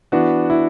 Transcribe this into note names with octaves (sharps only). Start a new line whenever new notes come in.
E3 B3 D4 F#4
E4